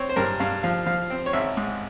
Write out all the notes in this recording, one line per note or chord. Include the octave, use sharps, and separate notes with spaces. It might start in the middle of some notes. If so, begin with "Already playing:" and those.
Already playing: C4 C#5
C5
G2 A#4
G2 F5
F3 F5
F3 F5
C4
C#5
G#1 E5
G#2